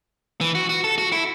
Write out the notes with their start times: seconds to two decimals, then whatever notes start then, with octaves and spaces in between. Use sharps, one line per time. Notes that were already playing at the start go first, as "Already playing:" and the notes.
0.41 E3
0.55 F#4
0.69 F#4
0.84 A4
0.98 F#4
1.12 E4